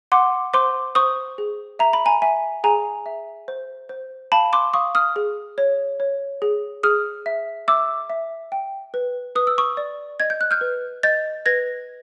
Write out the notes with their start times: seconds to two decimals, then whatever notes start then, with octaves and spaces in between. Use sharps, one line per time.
0.12 F#5 C6 D6
0.54 C5 C6 D6
0.95 C5 C#6 D#6
1.38 G#4
1.79 E5 A#5
1.93 B5
2.06 G#5 A#5
2.22 E5 G#5
2.64 G#4 G#5 A#5
3.06 E5
3.48 C5
3.89 C5
4.32 F5 A5 B5
4.53 C6 D6
4.74 F5 C#6 D#6
4.95 D#6 F6
5.16 G#4
5.58 C#5
6.00 C#5
6.42 G#4
6.83 G#4 D#6 F6
7.26 E5
7.68 E5 D6 E6
8.10 E5
8.52 G5
8.94 B4
9.35 B4 D#6
9.47 E6
9.58 C#6 D#6
9.77 D5
10.20 D#5 G#6
10.30 G6
10.41 F#6
10.51 F6 G6
10.61 B4
11.03 D#5 G6 A6
11.46 B4 G#6 A#6